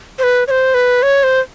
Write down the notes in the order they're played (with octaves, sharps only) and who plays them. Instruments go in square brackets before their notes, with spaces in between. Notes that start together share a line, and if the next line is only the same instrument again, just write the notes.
[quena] C5
B4
C#5
C5
B4
C#5
C5